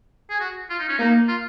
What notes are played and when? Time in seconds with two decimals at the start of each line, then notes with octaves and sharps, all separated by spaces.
0.30 G#4
0.40 F#4
0.70 F4
0.79 D#4
0.89 C#4
0.98 A#3 D#4
1.28 F4